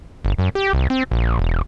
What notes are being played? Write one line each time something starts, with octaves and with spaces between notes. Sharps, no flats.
G1
F#2
G4
C2
C4
A#1
E1